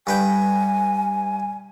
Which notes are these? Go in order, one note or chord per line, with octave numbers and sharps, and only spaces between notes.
G2 B4 G5 G#5